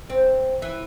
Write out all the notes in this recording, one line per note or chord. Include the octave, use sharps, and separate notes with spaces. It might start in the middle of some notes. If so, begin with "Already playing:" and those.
C4
E3